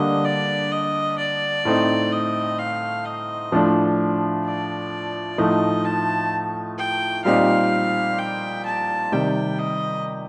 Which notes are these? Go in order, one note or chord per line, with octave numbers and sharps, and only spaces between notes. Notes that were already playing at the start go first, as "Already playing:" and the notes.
Already playing: D3 G3 A#3 D4 D#5
D5
D#5
D5
A2 A3 C4 D#4
D#5
F5
D#5
A2 F3 A3 D4
D5
A2 F3 A3 D#4 D#5
A5
G5
A#2 G3 C4 D#4 F5
G5
A5
C3 D#3 G3 G5
D#5